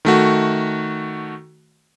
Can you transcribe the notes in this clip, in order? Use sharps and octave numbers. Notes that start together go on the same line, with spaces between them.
D#3 A3 F#4